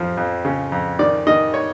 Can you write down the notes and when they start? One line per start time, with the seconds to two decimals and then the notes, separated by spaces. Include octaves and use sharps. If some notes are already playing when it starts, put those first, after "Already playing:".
Already playing: F2 F3
0.17 F2
0.45 C#3
0.72 F2
0.99 D#3 D5
1.27 D#3 D#5
1.54 C#5